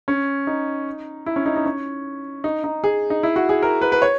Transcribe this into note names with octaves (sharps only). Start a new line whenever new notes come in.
C#4
D#4
E4
C#4
D#4
D#4
C#4
D#4
D#4
G#4
D#4
E4
F#4
G#4
A#4
B4
B4
C#5